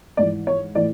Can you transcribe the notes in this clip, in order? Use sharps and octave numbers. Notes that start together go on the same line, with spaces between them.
G#2 E3 D5
C#5
A2 E3 D5